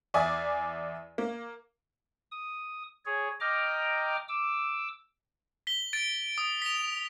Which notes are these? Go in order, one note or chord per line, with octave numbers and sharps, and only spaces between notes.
E2 D5 E5 G#5 D#6
A#3
D#6
G#4 C#5
D#5 G5 A#5 D6 F6
D6 E6
B6 G7
A6 D7
D#6
B6 F7